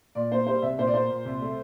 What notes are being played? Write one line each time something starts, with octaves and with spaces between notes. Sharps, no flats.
A#2 D5
A#3 C5
G3 C5
C2 E5
A#2 C5
D5
A#3 C5
A#2
C2
A3